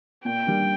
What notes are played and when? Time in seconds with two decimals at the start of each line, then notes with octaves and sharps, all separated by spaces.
0.25 A#2 G5
0.47 G3 A#3 D4